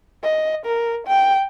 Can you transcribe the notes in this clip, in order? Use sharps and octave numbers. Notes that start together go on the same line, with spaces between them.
D#5
A#4
G5